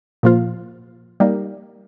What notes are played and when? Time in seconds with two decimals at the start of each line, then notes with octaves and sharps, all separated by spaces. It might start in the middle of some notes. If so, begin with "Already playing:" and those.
0.23 A#2 F3 A#3 F4
1.20 G3 A#3 D#4